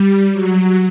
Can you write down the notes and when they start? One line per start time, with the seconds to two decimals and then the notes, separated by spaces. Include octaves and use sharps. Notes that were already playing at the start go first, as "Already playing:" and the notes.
Already playing: G3
0.32 F#3